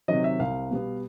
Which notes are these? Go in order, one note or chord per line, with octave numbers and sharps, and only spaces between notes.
C3 D#3 F#3 D#5
E5
C2 F5
B2 G3 B3